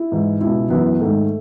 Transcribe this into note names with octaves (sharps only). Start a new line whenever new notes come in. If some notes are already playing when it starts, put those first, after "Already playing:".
Already playing: E4
G#2 E3
C#2 B2 E4
F#2 E3 B3
G#2 D#3 A3